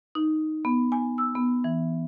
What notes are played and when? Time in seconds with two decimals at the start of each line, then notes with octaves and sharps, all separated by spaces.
0.15 D#4
0.65 B3
0.92 G#5
1.18 E6
1.35 B3
1.64 E3